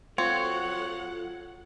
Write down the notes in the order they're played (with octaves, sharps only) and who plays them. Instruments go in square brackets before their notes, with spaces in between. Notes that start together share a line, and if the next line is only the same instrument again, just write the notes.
[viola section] F#3 A4 F#5 [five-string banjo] C4 [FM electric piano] F4 [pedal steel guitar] C#5